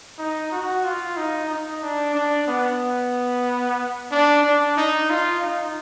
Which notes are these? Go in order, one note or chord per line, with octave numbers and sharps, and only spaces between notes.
D#4
F#4
F4
D#4
D#4
D4
D4
B3
D4
D4
D#4
F4
D#4